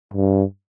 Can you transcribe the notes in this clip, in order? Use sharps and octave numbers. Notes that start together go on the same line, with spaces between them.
G2